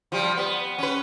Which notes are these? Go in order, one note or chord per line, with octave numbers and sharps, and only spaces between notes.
F3 G3
B3
C#4 B4